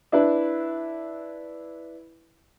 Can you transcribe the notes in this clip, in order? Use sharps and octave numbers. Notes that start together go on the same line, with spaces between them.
D4 E4 B4